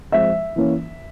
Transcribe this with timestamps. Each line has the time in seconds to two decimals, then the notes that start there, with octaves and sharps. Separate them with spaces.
0.12 F3 G#3 C4 E5
0.56 E3 A#3 C#4